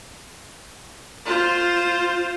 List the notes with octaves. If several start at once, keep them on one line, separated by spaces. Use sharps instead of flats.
F4 C5